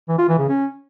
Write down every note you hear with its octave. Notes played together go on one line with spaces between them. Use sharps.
E3
F4
E3
C#3
C#4